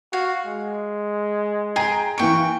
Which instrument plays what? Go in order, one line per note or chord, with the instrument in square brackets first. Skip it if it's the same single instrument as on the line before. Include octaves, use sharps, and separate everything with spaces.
[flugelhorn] F#4 [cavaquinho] F5
[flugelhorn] G#3
[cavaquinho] G#4 [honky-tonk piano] G5 A#5
[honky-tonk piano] E3 A#3 D7 [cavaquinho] G5 C#6